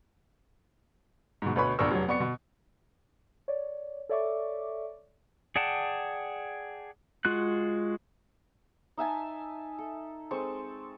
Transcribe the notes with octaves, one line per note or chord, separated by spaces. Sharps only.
G#2 B2
D2 B2 B4 C#5 B5 C#6
A#1 E2 D4 A#4 C#6 E6
F1 F#3 C#5
F2 B3 D5 C#6 C#7
B2
C#5 D5
A4 C#5 D5 E5 C#6 D6
G#4 D5 F#5 G5 A5
G#3 F4 F#4 F#6
D#4 E5 G#5 A5
A4
G#3 C4 A4 C#6